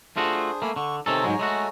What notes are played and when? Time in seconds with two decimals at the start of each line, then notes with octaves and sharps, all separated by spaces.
0.16 A3 D4 F4 F#4 G#4 C5
0.62 A3 A#3 G#5 B5
0.76 D3 C#6
1.06 C3 D#3 A4 C#5 G#5 A#5
1.24 G#2 F#3 G#3
1.39 G#3 A3 F#4